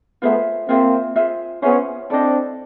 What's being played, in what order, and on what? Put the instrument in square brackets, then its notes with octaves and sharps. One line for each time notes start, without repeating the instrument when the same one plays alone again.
[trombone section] A3 B3 [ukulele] F4 G#4 C5 E5
[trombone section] A#3 C4 [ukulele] F4 G#4 C5 E5
[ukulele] F4 G#4 C5 E5
[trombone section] B3 C#4 [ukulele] F4 G#4 C5 E5
[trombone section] C4 D4 [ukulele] E4 A4 C5 D#5